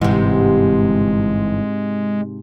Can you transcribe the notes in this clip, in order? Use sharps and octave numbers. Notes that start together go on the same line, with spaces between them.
G1 G#2 C3 E3 G#3